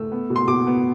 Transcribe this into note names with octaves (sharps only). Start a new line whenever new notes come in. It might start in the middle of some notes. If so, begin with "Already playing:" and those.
Already playing: A3 E6
B3
B2
C6
B2 D6
B3